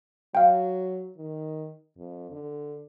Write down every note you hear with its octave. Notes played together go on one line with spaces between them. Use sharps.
F#3 F5 G5
D#3
F2
D3